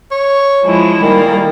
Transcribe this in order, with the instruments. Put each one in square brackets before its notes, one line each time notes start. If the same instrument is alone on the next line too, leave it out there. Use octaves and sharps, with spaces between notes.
[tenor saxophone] C#5
[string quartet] F3 G#3 E4
[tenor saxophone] D#3 [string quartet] G3 A#3